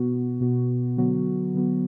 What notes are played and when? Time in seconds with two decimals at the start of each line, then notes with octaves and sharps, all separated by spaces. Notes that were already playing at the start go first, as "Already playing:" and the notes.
Already playing: B2 B3 F#4
0.41 B2 B3 F#4
0.97 D3 F#3 B3 F#4
1.54 D3 F#3 B3 F#4